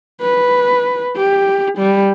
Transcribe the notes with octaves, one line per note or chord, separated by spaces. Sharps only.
B4
G4
G3